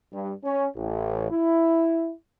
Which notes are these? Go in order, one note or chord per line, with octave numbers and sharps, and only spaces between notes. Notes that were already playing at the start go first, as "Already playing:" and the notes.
G2
C#4
A1
E4